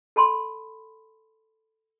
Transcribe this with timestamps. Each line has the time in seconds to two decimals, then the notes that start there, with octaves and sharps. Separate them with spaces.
0.16 A4 A5 B5 C6